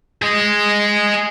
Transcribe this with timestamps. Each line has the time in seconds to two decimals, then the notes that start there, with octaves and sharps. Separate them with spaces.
0.22 G#4 D#5